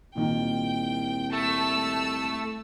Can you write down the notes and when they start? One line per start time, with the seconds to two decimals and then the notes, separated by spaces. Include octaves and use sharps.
0.16 C2 A#2 D#3 G5
1.32 A3 A5 E6